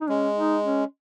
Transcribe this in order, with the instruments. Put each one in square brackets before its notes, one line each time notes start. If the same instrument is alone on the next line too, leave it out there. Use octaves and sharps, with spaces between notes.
[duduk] D#4
[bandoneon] G#3 [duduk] C#4
[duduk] D#4
C#4